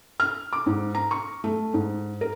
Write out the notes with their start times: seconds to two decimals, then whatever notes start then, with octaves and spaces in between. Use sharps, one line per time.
0.20 F6
0.53 D6
0.66 G#2
0.95 A#5
1.11 C#6
1.44 A3
1.74 G#2
2.21 A#4